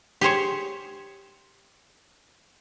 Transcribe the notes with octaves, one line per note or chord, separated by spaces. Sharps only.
G4 G#4 C5 C#5